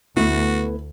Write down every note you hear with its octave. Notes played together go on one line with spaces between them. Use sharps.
D2 A3 B3 E4 F#4